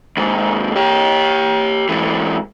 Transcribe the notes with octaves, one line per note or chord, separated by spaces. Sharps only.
D#2 G#2
G4 C#5
G#2 E3